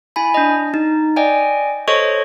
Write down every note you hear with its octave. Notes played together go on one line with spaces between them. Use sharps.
E4 G#5 B5
D4 D#5
D#4
D5 D#5 G5 G#5
A4 C5 C#5 D#5 C#6